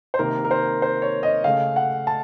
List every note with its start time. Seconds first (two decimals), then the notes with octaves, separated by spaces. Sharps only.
0.14 C5
0.19 C3 D#3 A#3 A#4
0.45 A#4
0.51 C5
0.82 C5
1.02 C#5
1.23 D#5
1.44 C#3 A3 F5
1.76 F#5
2.07 A5